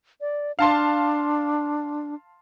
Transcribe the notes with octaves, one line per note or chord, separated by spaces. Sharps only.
D5
D4 F5 A5 C6